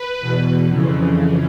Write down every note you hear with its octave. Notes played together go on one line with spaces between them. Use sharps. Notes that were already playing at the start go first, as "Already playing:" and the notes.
Already playing: B4
E2 B2
F2 C#3 E3